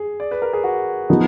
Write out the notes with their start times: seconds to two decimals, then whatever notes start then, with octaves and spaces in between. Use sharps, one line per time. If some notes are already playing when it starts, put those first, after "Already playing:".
Already playing: G#4
0.20 D5
0.31 B4
0.42 A#4
0.53 G#4
0.64 F#4
1.10 F3 B3 D#4